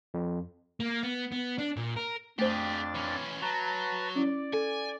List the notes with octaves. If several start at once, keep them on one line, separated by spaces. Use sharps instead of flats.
F2
A#3
B3
B3
D4
A#2
A#4
F2 A3 D4 G4 G#4 C5 A6
E3 C#4
F#3 B4 A5 A#5
C#4 E4 D5
A4 G#5